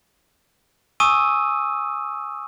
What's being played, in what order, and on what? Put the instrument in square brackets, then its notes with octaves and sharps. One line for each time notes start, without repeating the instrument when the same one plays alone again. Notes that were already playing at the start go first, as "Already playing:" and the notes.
[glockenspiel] G#5 C#6 D#6 E6 D#7